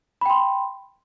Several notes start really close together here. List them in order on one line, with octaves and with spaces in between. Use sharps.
B5 G5 C6